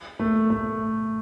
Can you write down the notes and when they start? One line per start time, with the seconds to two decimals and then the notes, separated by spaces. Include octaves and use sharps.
0.19 A3
0.50 A3